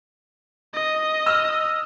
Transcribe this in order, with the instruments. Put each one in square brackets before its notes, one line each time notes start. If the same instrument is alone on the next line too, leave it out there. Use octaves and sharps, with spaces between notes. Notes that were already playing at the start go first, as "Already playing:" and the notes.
[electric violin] D#5
[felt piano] E6 F6